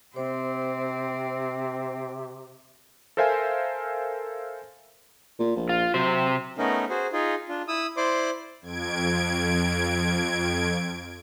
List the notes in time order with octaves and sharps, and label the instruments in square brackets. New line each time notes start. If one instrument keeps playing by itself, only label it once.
[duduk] C3 [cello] C4 [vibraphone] C5
[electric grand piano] A4 A#4 C5 E5 F5 G#5
[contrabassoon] A#2
A#1
[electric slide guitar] F4
[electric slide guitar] C3 C5 [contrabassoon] F#3
[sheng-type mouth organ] A3 B3 C#4 D#4 A#4
F#4 G#4 C5
D#4 F4 G#4
D4 F4
E4 D#6 E6
E4 C5 D5 C6 D6
[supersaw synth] F2 G#6 D7